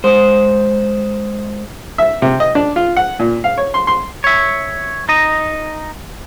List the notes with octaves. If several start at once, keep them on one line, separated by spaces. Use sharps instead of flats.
G#3 C5
E5
C3
D#5
D4
F4
F#5
A#2
F5
C#5
C6
C6
C#5 E5
D#4 D#5